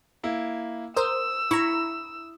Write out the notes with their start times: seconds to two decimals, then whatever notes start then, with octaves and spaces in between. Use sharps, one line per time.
0.23 A#3 E4
0.96 A#4 C5 D#6 E6
1.51 E4 A#5 C#6